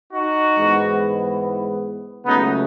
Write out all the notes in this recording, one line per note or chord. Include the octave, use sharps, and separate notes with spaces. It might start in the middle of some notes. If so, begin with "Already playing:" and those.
D#4 F#4
G#2 E3 B3
C#2 C#3 F#3 A3 B3 D#4